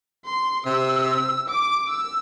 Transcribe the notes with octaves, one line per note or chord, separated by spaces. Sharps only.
C6
C3 E6
D6
E6